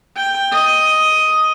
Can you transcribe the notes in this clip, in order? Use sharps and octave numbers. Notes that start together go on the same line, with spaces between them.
G5
D#5